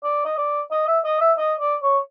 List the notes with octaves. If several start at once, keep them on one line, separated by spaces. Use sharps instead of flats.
D5
D#5
D5
D#5
E5
D#5
E5
D#5
D5
C#5